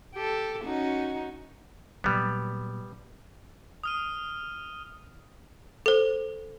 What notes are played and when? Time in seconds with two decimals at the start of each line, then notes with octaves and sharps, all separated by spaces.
0.14 G4 A4
0.64 C#4 D#4 F#4
2.04 A#2 F#3 G3 B3
3.84 D#6 F6 D#7
5.86 A4 C5